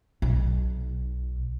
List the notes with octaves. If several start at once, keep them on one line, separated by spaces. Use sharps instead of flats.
B1